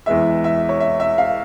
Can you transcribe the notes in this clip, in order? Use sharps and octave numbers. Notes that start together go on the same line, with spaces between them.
E2 E3 G#3 E5
E5
C#5
E5
E5
F5